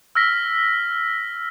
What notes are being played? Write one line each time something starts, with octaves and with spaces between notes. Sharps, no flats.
E6 F6 A#6 B6